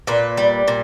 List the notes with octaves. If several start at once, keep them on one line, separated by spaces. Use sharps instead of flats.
A#2 B4
G3
A#2